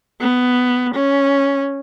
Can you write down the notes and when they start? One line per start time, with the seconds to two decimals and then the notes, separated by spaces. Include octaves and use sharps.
0.21 B3
0.95 C#4